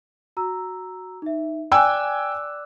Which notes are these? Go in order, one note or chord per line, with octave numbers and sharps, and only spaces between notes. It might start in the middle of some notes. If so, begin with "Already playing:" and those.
F#4 A#5 E6
D#4 E5
D5 G5 G#5 D6 E6 F#6